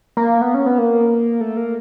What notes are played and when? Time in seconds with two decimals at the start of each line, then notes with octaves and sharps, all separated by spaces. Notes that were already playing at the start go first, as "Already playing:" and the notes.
0.17 A#3
0.42 B3
0.54 C#4
0.66 B3
0.78 A#3
1.41 A3
1.57 A#3